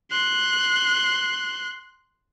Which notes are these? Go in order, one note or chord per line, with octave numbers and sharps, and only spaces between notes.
C6 F#6